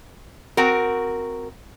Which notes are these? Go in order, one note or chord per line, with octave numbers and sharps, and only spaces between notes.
C4 F#4 A#4